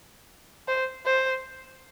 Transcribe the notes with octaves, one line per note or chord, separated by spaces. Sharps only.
C5
C5